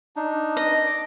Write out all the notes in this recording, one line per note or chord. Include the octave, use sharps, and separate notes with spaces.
D4 D#4
D#5
D6